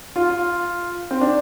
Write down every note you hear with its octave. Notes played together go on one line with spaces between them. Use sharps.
F4
F4
C4
D4